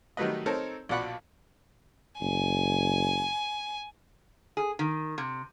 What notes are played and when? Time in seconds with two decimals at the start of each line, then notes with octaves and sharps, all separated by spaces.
0.17 D#3 F#3 G3 A3 B4 D#5
0.46 C4 D#4 A4 A#4 C#5
0.89 A#1 B2 D5 F#5 B5 C#6
2.21 F#1 G#5
4.57 G#4
4.79 D#3
5.18 C3